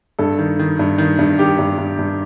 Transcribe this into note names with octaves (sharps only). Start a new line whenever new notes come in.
G2 A4
D#3
D#3
G2
D#3
G2
D#3 G4
G2
G2
G2